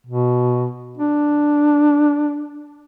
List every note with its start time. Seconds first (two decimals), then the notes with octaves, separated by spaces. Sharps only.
0.07 B2
0.97 D4